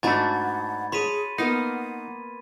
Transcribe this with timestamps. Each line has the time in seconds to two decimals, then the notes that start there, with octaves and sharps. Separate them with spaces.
0.03 G#2 A3 D4 F#4 B5 C#6 G#6 A6
0.34 F#5
0.92 G#4 C#5 A5 C6 B6 D#7
1.38 A#3 B3 D#4 F5 F#5